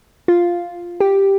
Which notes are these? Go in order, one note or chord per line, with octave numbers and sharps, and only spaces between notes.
F4
G4